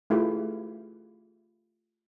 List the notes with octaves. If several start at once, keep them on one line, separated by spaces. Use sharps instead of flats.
A3 E4 F4 G4 G#4